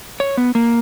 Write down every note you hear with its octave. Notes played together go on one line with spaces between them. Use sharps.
C#5
B3
A#3